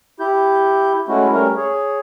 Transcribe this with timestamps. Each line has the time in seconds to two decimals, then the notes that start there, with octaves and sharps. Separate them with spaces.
0.20 E4 G4 G6
1.08 G#3 A3 C#4 E4 F#4
1.31 G3 A3 C#4 A#4
1.57 G#4 C#5